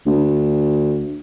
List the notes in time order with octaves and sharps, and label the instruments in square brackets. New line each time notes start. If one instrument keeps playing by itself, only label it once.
[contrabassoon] D2